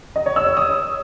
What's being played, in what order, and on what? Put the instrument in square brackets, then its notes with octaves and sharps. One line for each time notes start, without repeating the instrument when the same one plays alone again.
[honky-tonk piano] D#5
C#5
E6
C#5
D#6